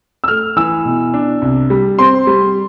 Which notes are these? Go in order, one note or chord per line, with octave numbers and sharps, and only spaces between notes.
E6
A3 F6
E3 E6
B2
D4
C2
G3
C4 C6
G3